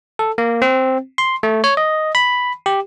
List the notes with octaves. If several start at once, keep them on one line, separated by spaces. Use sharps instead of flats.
A4
A#3
C4
C6
A3
C#5
D#5
B5
G4